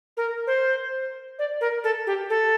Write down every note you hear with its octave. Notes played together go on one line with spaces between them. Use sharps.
A#4
C5
D5
A#4
A4
G4
A4